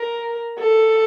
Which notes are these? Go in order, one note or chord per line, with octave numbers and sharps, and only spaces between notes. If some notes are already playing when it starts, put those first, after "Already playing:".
Already playing: A#4
A4